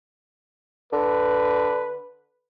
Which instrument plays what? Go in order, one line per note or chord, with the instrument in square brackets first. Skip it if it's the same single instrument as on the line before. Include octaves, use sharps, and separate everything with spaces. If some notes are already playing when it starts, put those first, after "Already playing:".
[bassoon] D3 [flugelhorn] B4